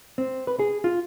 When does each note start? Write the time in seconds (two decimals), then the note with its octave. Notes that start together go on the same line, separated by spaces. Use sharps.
0.18 C4
0.47 B4
0.59 G#4
0.84 F4